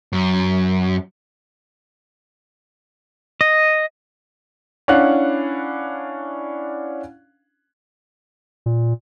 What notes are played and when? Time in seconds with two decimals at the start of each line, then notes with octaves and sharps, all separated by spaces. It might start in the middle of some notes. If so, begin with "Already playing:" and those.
0.13 F#2
3.41 D#5
4.88 C#4 D4 E4 F5 F#5 F#6
8.66 A#2